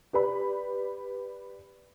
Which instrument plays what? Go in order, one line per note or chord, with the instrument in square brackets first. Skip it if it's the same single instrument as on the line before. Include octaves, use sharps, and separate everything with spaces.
[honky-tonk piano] G4 B4 D5 B5